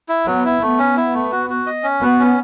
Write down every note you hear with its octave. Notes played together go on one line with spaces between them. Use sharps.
E4
F#3 B3
E4
A3 B3
C#4
E4
A3
F#4
F#4
D#5
C#4
B3 F#4
C#4